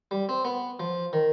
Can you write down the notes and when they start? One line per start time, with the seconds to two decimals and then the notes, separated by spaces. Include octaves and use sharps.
0.11 G3
0.29 C4
0.45 B3
0.80 F3
1.13 D#3